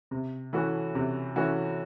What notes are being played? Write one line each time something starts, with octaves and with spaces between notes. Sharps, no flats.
C3
E3 A3 C#4 F#4
C3
E3 A3 C#4 F#4